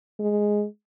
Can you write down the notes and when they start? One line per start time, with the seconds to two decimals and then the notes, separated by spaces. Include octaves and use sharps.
0.19 G#3